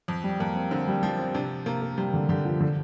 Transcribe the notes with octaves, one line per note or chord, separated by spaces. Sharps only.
F2
G3
F2 A#3
C4
D3 C4
G3
F3 G3
C4
C3 D4
C3 A#3
A#3
C3 G3
D3
D3 G4
F3
D3